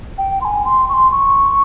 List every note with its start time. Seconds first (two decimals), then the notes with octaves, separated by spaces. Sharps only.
0.18 G5
0.41 C6
0.45 G#5
0.65 C6
0.89 C#6
0.94 C6
1.12 C#6